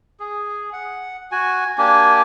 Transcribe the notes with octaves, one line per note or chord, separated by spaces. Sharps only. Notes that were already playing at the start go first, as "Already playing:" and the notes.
G#4
F#5
F#4 G#5
A#3 D4 G4 G#5